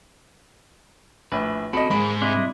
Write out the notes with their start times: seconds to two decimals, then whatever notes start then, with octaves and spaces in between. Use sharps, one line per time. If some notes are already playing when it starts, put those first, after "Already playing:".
1.32 A#1 A2 B4
1.73 C4 F#4 A4 D#5 B5
1.91 G#2 G#3 A#3 B5
2.22 C3 D4 E4 D#5